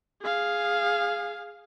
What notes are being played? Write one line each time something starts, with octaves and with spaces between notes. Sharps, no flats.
G#4 F5